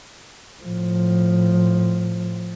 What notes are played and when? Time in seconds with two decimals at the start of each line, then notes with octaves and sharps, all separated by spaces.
0.64 A2 F3